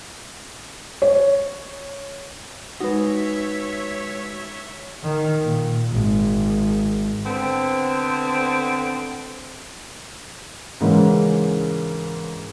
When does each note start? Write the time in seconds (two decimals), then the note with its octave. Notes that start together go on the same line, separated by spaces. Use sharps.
1.02 C#5
2.80 G#3 D#4 F#4 B4 C#5 E5
5.03 D#3
5.44 A#2
5.91 G#1
7.26 D3 B3 C4
10.80 G#2 C#3 E3 G#3 A#3 C#4